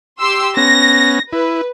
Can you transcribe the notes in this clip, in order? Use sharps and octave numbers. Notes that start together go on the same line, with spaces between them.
G4 C6 E6
B3 C#4 A#6
E4 B4